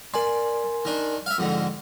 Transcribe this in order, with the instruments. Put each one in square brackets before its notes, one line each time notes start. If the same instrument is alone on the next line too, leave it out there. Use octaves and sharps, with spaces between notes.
[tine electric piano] A#4 G#5 C6 [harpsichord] D5
[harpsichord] D#3 D4
E5 F5
F2 G#2 D3